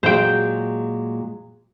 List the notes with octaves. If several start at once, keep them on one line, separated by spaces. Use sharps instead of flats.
A#2 F#3 G#3 C5 G5